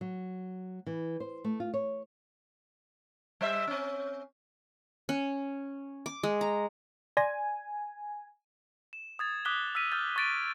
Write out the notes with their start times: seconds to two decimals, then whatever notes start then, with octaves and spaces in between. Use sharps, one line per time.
0.01 F#3
0.87 E3
1.20 C5
1.44 A3
1.60 F4
1.74 C#5
3.41 G3 C5 E5
3.67 C4 C#4
5.09 C#4
6.06 D6
6.23 G#3
6.41 A#5
7.17 D5 G#5 C6 A#6
8.93 E7
9.19 D#6 G#6 A6
9.45 D6 D#6 F#6 B6 G7
9.75 E6 F6 B6 D#7 F7
9.92 F6 G6 A6
10.16 C#6 D#6 A6 D7 D#7